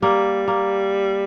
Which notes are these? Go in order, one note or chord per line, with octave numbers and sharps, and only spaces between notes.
G3 A#3
A#3